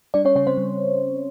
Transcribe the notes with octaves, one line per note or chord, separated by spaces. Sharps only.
G3 D4 D5
C#4 C#5
C#3 C#4 C#5
C4 C5
G3